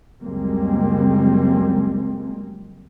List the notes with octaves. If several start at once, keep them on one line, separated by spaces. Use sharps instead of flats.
C#2 F#2 G3 G#3 A#3 C4